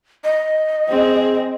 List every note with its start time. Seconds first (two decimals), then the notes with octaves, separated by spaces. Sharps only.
0.24 D#5
0.89 C4 G#4